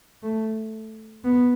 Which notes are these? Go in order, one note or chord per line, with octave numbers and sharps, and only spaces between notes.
A3
B3